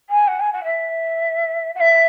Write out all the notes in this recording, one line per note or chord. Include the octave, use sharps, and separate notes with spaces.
G#5
F#5
G#5
F#5
E5
F#5
E5